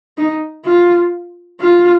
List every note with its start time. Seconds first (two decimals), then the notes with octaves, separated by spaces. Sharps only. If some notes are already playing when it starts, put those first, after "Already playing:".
0.18 D#4
0.65 F4
1.60 F4